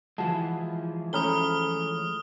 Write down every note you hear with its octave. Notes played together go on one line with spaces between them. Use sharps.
E3 F3 G#3 E4 F#4 A5
A3 C#4 C5 A#5 B5 D#6 F6 G7